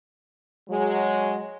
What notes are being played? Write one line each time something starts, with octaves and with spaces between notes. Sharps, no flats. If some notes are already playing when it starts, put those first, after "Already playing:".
F#3 G#3